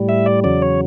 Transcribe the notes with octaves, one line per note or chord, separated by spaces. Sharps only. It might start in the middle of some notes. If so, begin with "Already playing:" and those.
Already playing: A2 G3
E5
D5
E2 C#3 F#3 D5
C#5